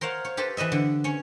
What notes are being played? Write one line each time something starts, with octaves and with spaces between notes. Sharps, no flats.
A#4 C5 C#5 F5 F#5
C#5
G4 A4 B4 C5
E3 B4 D#5 E5
D3
C#4 C#5